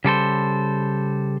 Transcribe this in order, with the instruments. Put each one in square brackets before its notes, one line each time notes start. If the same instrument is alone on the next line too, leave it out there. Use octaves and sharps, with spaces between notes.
[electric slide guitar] C#3 G3 A4 C5